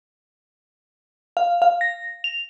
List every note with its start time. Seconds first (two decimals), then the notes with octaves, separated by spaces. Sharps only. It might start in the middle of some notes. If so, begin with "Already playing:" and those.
1.37 F5
1.62 F5
1.81 A#6
2.24 F7